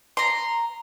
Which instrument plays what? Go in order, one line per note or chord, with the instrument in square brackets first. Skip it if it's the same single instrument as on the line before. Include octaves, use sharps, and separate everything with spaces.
[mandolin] A#5 C6